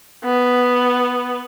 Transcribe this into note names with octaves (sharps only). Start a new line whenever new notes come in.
B3